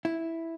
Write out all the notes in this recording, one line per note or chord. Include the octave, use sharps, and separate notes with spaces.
E4